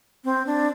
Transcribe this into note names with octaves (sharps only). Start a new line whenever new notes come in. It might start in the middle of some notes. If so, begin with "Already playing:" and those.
C4
D4